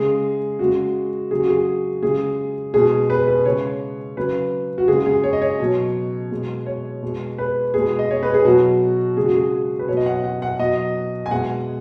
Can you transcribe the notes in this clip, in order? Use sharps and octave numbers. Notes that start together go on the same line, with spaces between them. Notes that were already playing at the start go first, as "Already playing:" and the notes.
Already playing: C#3 G#3 G#4
C#3 G#3 F#4
C#3 F#3 G#4
F#4
G#4
C#3 G#3 G#4
B2 G#3 G#4
B4
B4
C#3 G#3 C#5
C#3 F#3 B4
F#4
C#3 G#3 G#4
G#4
C#5
D#5
C#5
B2 F#3
B2 G#3
C#5
B2 G#3
B4
B2 G#3 G#4
D#5
C#5
B4
G#4
B2 F#3 F#4
C#3 G#3 G#4
F#4
G#4
B4
B2 F#3 C#5
D#5
F#5
F#5
F#5
B2 F#3 D#5
G#5
B2 G#3 F#5